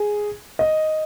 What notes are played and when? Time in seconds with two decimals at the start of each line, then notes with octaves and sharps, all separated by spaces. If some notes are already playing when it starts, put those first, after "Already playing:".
Already playing: G#4
0.59 D#5